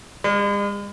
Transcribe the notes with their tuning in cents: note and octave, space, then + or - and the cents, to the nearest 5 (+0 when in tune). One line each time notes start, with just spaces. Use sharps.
G#3 -45